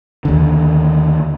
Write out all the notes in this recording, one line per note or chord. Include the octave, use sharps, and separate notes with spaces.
D#2 D3